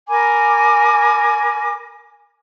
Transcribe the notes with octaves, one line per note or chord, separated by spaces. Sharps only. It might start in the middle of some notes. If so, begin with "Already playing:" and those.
A#4 G#5 B5 D6